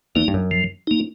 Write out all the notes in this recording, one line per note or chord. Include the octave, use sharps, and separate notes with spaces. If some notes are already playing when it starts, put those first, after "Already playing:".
E2 A#3 D#4
G2
F#2
F3
A#3 D#4